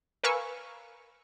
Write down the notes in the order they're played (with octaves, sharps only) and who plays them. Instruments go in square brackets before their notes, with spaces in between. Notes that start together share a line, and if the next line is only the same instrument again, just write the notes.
[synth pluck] A#4 B4 F5 G#5 C#6 E6